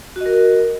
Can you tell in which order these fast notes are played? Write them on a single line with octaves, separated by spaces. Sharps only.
F#4 D#5 A#4